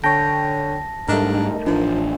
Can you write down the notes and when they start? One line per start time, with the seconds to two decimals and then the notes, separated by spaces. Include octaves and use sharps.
0.04 D3 C#5 G5 A5 A#6
1.08 G#2 G3 A3 D4 D#4 A#4
1.67 A1 F3 D4